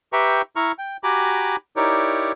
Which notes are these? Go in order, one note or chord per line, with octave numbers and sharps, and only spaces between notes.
G4 B4 E5 G5 A#5 C#6
E4 A#5 C#6 F6
G5
F#4 G4 G#5 A#5 B5 D6
D#4 E4 G4 A#4 C#5 D5